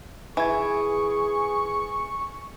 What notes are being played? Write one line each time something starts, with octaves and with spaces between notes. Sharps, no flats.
E3 G#4 G#5 C#6 G#6